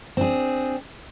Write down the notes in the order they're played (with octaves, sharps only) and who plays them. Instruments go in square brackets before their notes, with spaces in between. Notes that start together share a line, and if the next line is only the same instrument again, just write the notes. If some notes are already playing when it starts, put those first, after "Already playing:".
[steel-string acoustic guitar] C4 D4 G#4